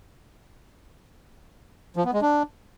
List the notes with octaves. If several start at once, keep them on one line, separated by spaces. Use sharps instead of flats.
F3
B3
G#3
D4